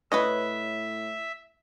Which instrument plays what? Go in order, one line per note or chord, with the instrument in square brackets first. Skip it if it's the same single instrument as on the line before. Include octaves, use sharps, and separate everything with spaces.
[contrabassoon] A2 [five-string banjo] B4 C#5 D#5 [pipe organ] E5